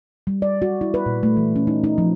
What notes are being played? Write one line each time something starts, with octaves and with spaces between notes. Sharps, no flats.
G3
D5
F#4
E4
B4
A#2
A3
E3
C#4
D#4
D#4
F3